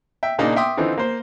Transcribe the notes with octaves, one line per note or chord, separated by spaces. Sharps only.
E5 G5
A#2 C#3 A#3 D4 D#4
E5 G5 C6 D6 D#6
D3 E3 C4 D#4 F4
A#3 C5